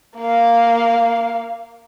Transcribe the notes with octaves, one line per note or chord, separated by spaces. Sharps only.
A#3 F5